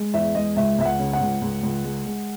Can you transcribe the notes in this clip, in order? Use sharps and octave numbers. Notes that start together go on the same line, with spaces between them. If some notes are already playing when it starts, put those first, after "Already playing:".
Already playing: G#3
E2 E5
G#3 D#5
C#2 E5
C#2 E5
F#5
C#3
F#5
C#2
C#2
C#2
G#3
G#3